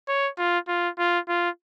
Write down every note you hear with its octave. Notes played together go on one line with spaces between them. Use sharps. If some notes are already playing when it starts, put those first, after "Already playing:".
C#5
F4
F4
F4
F4